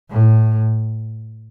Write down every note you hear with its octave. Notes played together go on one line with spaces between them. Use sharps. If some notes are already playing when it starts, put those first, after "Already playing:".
A2